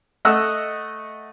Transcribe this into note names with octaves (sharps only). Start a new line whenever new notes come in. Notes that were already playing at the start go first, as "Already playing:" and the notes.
A3 D#5 F#5 E6